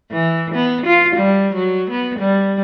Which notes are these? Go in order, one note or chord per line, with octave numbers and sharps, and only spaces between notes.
E3
B3
F4
G3
F#3
B3
G3